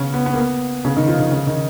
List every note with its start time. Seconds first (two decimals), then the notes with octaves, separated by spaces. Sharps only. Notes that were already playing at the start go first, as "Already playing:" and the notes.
Already playing: C#3 B3 C#4
0.14 B3
0.26 B3
0.33 A#3
0.38 B3
0.85 C#3 C#4
0.96 D#3 D#4
1.07 F3 F4
1.20 D#3 D#4
1.32 C#3 C#4
1.47 D#3 D#4